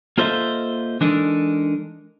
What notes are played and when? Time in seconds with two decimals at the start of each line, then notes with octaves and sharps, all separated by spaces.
0.18 A#3 F4 A4 C5 D#5 E5
1.01 E3 G#3 D4 D#4 A4 A#4